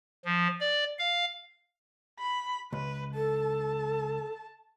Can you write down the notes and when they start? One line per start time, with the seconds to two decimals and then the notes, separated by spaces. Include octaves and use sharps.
0.25 F3
0.60 D5
0.99 F5
2.19 B5
2.73 C#2 B4
3.15 A4 A5